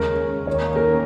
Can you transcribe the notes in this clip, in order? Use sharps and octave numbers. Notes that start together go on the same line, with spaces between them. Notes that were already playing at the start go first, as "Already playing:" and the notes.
Already playing: D#2 C#3 G#3 C#4 A#4
D#2 D#3 A#3 C#4 C#5
A#4